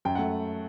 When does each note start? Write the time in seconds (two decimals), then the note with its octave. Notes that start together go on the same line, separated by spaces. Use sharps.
0.05 F#2 G5
0.15 A3 F#5